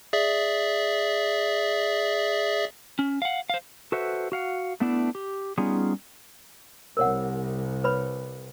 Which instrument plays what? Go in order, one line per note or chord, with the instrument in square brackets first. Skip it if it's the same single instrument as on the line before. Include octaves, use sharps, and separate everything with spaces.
[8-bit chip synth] G#4 D5 E5
[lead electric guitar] C#4
F5 F#5
C5 F5
[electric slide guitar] F#4 A4 B4 C5 E5 F#5
F#4 F5 F#5
A3 B3 D4 E4
G4
G3 B3 C#4 D#4 F4 G#4
[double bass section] C2 [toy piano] A#4 C#5 F#5
[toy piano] B4 C#5 B5